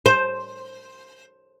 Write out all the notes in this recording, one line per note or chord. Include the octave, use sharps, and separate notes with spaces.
C5